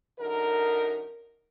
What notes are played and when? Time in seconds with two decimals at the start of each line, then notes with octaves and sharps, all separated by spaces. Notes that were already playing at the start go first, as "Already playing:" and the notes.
0.19 F#2 D3 D#4 A#4